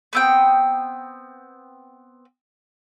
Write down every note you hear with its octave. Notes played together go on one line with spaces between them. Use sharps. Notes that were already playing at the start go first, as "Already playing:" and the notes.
B3 C4 G5